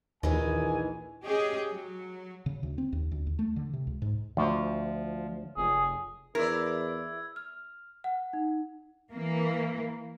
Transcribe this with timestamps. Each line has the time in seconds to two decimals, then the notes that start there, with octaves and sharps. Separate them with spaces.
0.23 A#1 D#2 D#3 E3 G#3 G#5
1.24 C#4 G4 G#4 D#5
1.72 F#3
2.46 C#3
2.63 D2
2.78 C4
2.93 D#2
3.12 D2
3.27 D#2
3.39 A3
3.56 D3
3.73 C3
3.87 C#2
4.02 G#2
4.37 D2 F3
5.57 F1 G#4
6.35 E2 E4 A#4 D5 E6 G#6
7.36 F6
8.04 F#5
8.33 D#4
9.11 E3 A#3